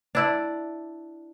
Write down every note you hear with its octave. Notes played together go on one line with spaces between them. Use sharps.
D4 E4 D5